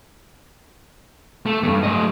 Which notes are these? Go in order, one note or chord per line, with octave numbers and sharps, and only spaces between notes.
A3
E2 G2
A3 D#5